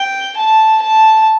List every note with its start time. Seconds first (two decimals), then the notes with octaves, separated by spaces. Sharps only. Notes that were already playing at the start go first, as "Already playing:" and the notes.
Already playing: G5
0.37 A5
0.83 A5